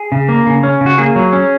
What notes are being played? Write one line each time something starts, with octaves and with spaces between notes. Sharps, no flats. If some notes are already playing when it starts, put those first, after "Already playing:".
Already playing: G#4
C#3
A#3
C#3
C#4
C#3
F#4
A#3 G#4
F#3
C#4